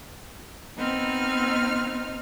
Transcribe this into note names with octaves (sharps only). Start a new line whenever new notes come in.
B3 C4 D#4 F6